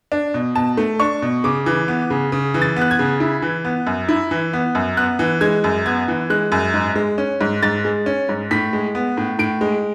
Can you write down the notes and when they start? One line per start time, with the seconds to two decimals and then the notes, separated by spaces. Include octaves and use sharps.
0.12 D4
0.34 B2
0.55 B2 A5
0.77 A3
1.00 D4 C#6
1.22 B2
1.44 C#3 D6
1.66 E3
1.88 B3
2.10 C#3
2.32 C#3
2.54 E3
2.62 A6
2.76 B3
2.81 F#6
2.91 G#6
2.99 C#3
3.20 E4
3.42 E3
3.65 B3
3.87 F#2
4.09 E4
4.31 E3
4.53 B3
4.75 F#2
4.97 B3 F#6
5.19 E3
5.41 G#3 G#6
5.64 F#2
5.86 B3 G#6
6.08 E3
6.30 G#3 F#6
6.52 F#2
6.74 G#2
6.95 G#3
7.18 C#4
7.41 G#2
7.63 G#2 A6
7.85 G#3
8.06 C#4
8.29 G#2
8.51 A2 B6
8.73 G#3
8.95 B3
9.17 A2
9.39 A2 D7
9.61 G#3